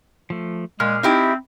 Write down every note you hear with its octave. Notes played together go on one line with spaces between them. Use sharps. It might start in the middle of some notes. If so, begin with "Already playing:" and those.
F3 A3
A#2 G#3 G#4 F6
C4 D#4 E4 G4